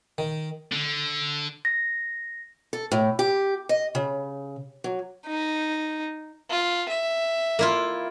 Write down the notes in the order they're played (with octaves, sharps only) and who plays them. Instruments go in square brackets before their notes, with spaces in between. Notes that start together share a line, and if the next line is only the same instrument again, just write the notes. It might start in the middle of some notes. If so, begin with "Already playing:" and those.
[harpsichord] D#3
[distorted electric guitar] D3
[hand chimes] A#6
[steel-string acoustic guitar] A4
A2
G4
D#5
C#3
F#3
[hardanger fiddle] D#4
[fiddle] F4
E5
[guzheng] A#3 E4 F4